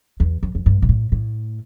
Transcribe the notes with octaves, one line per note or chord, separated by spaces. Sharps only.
E2
F2
F2
G2
A#2
A2
A2